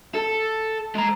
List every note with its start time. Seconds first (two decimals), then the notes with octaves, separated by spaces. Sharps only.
0.15 A4
0.95 G#3 A#5